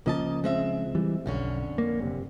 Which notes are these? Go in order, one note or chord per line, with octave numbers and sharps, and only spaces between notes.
C#2 C#3 F3 A#3 D#5 A5
G#3 C4 E5
E3 G3
B1 F2 D3 C#4
A#3
F#1 C3